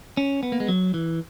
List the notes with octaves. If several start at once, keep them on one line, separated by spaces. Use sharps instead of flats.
C#4
B3
A#3
G#3
F#3
E3